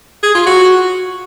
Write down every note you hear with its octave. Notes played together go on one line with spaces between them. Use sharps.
G#4
F4
F#4